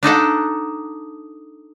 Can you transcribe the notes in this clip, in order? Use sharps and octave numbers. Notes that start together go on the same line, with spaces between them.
D4 D#4 A4 F#5